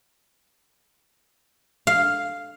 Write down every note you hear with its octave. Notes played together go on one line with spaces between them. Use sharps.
F5